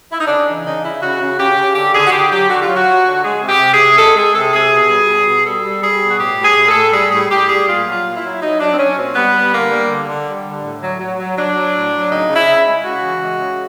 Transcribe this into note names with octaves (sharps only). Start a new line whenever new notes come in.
E4
D#4
C#3 D4
E3 D#4
C#3 D#4
C#3 E4
C#3 F#4
C#3
C#3 G4
C#3
D3 G4
D3 G#4
F#4
D3 G4
F#3 G4
D3 F#4
F4
F#3
F#4
F#3
D3
G#3 G#4
C3
G4
C3
G#4
C3
G#3 A4
G#3 G#4
C3 A4
C3 G#4
B2
G3
B2
B2
G3 A4
G3
G3 G#4
B2
F#4
A2 G4
A2
G#4
A2
A4
A2
G3 G#4
A2 G#4
A2 G4
G3 G#4
A#2 F4
F#3 F4
A#2
E4
F#3
F#3 D#4
F#3 D4
C4
F#3 C#4
A#2 C4
G3 B3
G3
D3 A#3
G3
D3
D3
G3
D3
A2
F#3
F#3
F#3
F#3 D4
F#3
A2
F#3
C#3 D#4
C#3
E4
C#3
G#3
C#3 F#4
E3
G#3
C#3